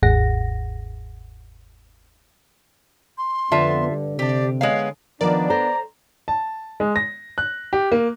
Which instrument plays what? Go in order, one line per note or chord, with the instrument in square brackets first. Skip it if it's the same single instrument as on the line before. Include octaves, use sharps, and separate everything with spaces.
[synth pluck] G1 D#2 G#2 G#4 F#5 A#6
[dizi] C6
[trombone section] F2 B3 [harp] D3 [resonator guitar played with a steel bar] F4 E5 A5
[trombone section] G2
[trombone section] C3 [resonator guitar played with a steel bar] D4 G4 [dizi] D5
[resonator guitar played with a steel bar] G#3 B3 F5 [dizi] C#5
[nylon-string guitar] D#3 F3 [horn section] B3 D4 [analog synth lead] A#4 [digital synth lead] D5
[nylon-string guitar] A4 C5 [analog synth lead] A#5
[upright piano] A5
G#3
A#6
F#6
G4
A#3